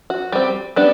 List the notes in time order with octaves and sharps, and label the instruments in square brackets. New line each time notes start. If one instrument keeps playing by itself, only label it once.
[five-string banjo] F#4
G3 C4
G3 B3 D4